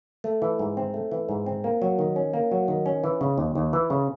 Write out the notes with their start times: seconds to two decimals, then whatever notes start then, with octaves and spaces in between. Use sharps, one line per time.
0.24 A3
0.42 E3
0.59 G#2
0.77 C4
0.94 A3
1.12 E3
1.29 G#2
1.46 C4
1.64 A#3
1.82 F#3
1.99 D#3
2.16 C#4
2.34 A#3
2.52 F#3
2.68 D#3
2.86 C#4
3.04 E3
3.21 C#3
3.38 D#2
3.55 D#2
3.73 E3
3.90 C#3